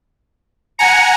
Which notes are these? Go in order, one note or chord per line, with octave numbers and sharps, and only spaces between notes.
F#5 G#5 A#5 C#7